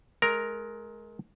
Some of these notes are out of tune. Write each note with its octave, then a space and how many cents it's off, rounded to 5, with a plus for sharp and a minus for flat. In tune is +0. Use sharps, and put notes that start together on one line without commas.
G#3 +30 A#4 +0 A#5 +0